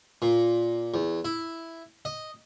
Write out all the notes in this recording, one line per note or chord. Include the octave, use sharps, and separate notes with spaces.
A#2
E2
E4
D#5